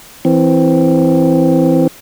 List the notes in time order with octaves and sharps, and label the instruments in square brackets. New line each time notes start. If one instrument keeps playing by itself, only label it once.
[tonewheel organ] E3 C4